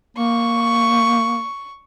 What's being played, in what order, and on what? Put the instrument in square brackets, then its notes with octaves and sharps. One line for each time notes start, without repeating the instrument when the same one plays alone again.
[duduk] A#3 [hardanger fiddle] C#6